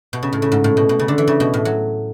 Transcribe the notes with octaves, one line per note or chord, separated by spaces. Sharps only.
B2
C#3
A2
C#3
G#2
A2
B2
B2
C#3
D3
E3
C#3
B2
A2
F#3